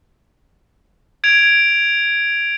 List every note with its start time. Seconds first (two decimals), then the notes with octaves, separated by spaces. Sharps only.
1.24 G#6 D7 F7